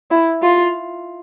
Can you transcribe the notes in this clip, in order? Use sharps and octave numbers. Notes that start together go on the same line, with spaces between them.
E4
F4